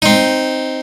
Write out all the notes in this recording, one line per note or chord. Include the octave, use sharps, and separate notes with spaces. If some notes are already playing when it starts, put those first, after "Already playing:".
C4 D#4